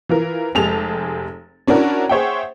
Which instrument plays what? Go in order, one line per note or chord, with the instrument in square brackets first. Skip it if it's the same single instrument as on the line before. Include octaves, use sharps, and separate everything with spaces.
[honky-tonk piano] E3 F4 A#4
F1 G#3 G4 G#4 A5 F7
C#4 D4 E4 F#4 A#4
G#4 C5 C#5 E5 F#5 G5